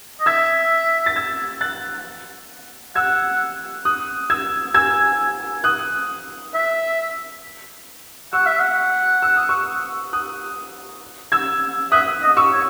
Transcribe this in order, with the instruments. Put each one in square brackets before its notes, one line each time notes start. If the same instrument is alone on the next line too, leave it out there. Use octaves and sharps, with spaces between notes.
[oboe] D#5
[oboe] E5 [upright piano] E6 G#6
[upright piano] A6
E6 G#6
F#6 A6
[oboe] F#5 [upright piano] E6 G#6
[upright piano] D#6 F#6
E6 G#6
[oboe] G#5 [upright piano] E6 G#6
[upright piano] D#6 F#6
[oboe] E5
[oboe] F#5 [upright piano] C#6 E6
[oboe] E5
F#5
[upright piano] E6
D#6
C#6 E6
D#6 F#6
E6 G#6
[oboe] E5 [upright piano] D#6 F#6
[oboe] D#5
[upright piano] C#6 E6
[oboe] C#5